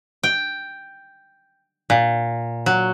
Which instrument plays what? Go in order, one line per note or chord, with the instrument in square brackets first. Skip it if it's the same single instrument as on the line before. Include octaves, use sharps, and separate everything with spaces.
[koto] G5
A#2
F#3